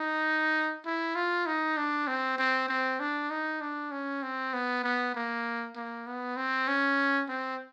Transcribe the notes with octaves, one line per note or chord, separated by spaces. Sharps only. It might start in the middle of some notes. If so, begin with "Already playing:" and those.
Already playing: D#4
E4
F4
D#4
D4
C4
C4
C4
D4
D#4
D4
C#4
C4
B3
B3
A#3
A#3
B3
C4
C#4
C4